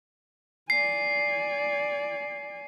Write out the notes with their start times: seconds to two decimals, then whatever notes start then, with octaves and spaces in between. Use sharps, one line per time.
0.70 D5 G#5 C7